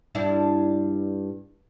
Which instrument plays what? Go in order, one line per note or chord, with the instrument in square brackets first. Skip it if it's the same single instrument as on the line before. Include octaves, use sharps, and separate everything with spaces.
[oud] G2 D4 E4